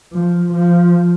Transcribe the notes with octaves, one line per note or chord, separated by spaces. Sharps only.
F3
F3